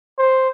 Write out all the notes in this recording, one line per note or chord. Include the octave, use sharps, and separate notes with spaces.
C5